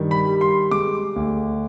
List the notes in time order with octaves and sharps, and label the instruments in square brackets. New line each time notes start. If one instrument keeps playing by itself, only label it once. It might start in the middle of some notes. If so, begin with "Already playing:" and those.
Already playing: [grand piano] G2 D#3
B5
G3
C6
G#3 D6
D2